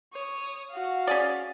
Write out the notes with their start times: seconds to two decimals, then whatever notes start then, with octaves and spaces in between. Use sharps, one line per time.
0.13 C#5 D#6
0.71 F#4 F5
1.07 C#4 G#4 D5